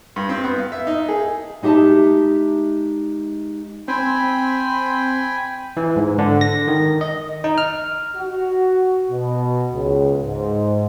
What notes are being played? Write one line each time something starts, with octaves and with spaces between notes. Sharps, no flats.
G2
C4
B3
F5
E5
D#4
G#4
G#3 D#4 G4 E5 A5
C4 G5 G#5 B5
E3
G#2
D3
A#6
D#3
D#5
D#4
F6
F#4
B2
C#2
G#2